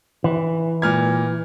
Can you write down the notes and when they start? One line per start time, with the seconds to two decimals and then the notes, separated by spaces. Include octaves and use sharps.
0.24 E3
0.82 A#2 F6 G#6